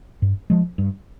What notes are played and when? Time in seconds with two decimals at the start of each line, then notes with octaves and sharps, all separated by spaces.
0.22 G2
0.50 F3 G#3
0.78 G2